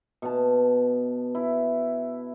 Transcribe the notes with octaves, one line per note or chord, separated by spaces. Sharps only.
B2 A5
E4